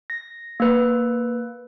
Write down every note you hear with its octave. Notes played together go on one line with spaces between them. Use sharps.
A#6
A#3 B4